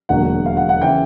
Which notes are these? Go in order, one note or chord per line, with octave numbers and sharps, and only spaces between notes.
E1 D#2 D3 F#3 F#5
F5
F#5
F#5
C#3 E3 G5